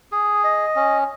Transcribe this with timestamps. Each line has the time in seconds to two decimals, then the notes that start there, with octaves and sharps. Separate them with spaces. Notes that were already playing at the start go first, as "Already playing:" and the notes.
0.12 G#4
0.44 D#5
0.76 C#4